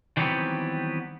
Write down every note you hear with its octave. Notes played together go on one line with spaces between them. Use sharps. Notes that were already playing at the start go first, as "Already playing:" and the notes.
D#3 E3 F#3 G3 B3 C4